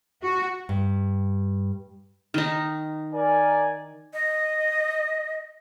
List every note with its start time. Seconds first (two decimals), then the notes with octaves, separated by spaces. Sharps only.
0.22 F#4
0.69 G2
2.34 D#3 D#4
3.13 A#4 D5 G#5
4.13 D#5